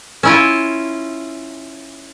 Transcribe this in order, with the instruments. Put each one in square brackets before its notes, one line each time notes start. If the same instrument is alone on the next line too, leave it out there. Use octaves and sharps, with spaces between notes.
[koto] C#4 E4 F4